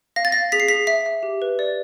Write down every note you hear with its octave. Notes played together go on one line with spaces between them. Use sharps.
F5 A#6
A6
F5 A#6
G#4 B6
C7
G#4 B6
E5 B6
E5
G4
B4
D5